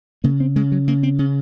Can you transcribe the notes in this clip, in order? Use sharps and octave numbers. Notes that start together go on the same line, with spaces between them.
C#3 A#3
C4
C#3 G#3
F#3
C#3 A#3
C4
C#3 C#4